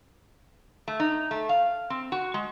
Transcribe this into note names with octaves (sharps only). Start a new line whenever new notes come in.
A3
D#4
A3
F5
C4
F#4
G#3